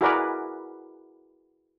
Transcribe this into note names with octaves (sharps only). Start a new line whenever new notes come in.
E4 F#4 G#4 A#4 B4 D5